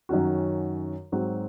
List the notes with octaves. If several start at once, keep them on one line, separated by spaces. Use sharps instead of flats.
F#2 D#3 F#3 C#4 F#4
G#2 F#3 C4 F#4